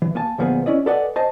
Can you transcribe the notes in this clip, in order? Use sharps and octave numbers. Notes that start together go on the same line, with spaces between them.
E3
A#3 G#5 A5
D2 A#2 F3 B3 G#4 G#5
C#4 E4 D5 D#5
A4 B4 D5 D#5 F#5 G#5
C5 D#5 G#5 A5